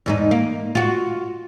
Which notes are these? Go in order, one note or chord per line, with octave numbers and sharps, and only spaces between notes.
E2 G#2 D#4
A#3
F4 F#4